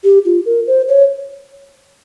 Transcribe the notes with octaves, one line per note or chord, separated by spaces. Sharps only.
G4
F4
A#4
C5
C#5